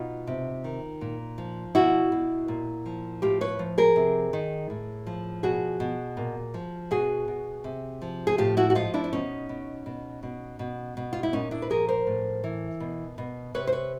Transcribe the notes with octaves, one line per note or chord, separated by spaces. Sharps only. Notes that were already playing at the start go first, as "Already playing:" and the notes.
Already playing: B2 D#4 F4
C3
D#3
A#2
F3
B2 E4 F#4
B2
A#2
F3
A2 F4 G4
B4 C#5
F3
G#4 A#4
C3
D#3
A2
F3
B2 F#4 G#4
B2
A#2
F3
B2 F#4 G#4
B2
C3
F3
G#4
A2 F4 G4
E4 F#4
F#4
F3 D#4 F4
D4 E4
D4
B2 C#4 D#4
B2
B2
B2
B2
B2
F4
E4
A#2 C#4 D#4
D4 E4
B4
F3 G#4 A#4
A#4 C5
A2
E3
B2
B2
C3 B4 C#5
C5
B4 C#5